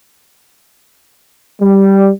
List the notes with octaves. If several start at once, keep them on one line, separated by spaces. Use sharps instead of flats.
G3